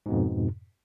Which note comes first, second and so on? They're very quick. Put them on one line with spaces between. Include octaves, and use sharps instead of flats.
G#2 B2 F2